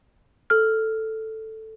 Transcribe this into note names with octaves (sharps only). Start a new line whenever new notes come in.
A4 F6